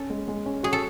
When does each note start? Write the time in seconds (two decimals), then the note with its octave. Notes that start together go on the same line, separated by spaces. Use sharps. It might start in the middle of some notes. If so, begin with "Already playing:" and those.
Already playing: C#4 A4
0.10 G#3
0.28 G#3
0.46 C#4
0.63 F#4 G#4
0.73 A4